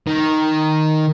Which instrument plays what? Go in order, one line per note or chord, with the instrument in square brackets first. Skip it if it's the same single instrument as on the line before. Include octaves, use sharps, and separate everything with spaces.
[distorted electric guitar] D#3